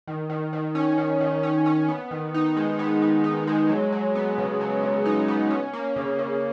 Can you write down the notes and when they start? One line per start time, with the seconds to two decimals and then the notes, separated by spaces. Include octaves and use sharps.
0.07 D#3
0.30 D#3
0.53 D#3
0.75 C#4
0.98 D#3
1.21 D#3
1.43 C#4
1.66 C#4
1.88 B3
2.11 D#3
2.34 D#4
2.57 G#3
2.79 B3
3.02 B3
3.24 D#4
3.47 G#3
3.69 F#3
3.92 F#3
4.15 B3
4.38 C#3
4.61 F#3
4.83 C#3
5.05 D#4
5.28 B3
5.50 C#4
5.73 A#3
5.96 C#3
6.19 C#3